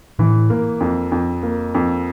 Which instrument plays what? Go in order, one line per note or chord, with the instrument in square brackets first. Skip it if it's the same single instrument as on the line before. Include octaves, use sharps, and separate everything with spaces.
[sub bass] A2 [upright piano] E3
[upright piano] A#3
F2
F2
A#3
F2